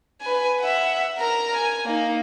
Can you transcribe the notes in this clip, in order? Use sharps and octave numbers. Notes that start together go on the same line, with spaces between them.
B4 G#5
E5 F#5
A#4 A#5
G#5
A#3 D#4